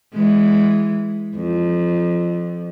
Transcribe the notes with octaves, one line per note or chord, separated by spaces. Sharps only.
E3 G#3
F2